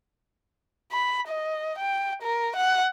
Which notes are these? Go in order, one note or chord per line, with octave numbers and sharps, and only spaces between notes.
B5
D#5
G5
A#4
F#5